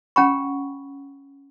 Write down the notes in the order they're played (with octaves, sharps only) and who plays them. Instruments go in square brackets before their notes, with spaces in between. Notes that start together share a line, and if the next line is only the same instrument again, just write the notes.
[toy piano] C#4 F#5 G5 A#5 B5 C#6